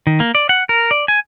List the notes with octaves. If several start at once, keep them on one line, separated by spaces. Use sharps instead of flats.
D#3
A#3
D5
F#5
A#4
D5
G#5